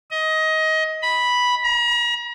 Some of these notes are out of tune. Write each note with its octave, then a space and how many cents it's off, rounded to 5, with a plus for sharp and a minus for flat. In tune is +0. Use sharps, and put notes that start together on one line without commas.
D#5 +20
B5 -5
A#5 +40